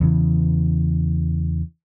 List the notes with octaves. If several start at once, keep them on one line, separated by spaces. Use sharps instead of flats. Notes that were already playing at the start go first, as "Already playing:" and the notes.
E2 C#3 E3